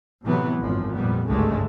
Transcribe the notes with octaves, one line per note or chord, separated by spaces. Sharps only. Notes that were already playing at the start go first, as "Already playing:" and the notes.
A2 C3 E3 F#3 B3
G#1 F#2 F3
F2 A#2 G3 B3
G#1 C#2 G2 D3 G#3 A3